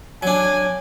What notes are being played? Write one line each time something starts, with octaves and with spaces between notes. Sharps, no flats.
F#3 D4 G#5